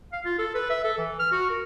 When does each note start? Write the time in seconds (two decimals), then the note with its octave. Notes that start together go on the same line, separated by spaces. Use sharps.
0.13 F5
0.25 F4
0.39 A4
0.55 B4
0.70 E5
0.84 A4
0.98 E3
1.19 F6
1.32 F#4
1.50 A#4